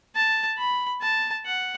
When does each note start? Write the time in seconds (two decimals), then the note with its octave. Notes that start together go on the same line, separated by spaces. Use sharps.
0.16 A5
0.58 B5
1.02 A5
1.46 F#5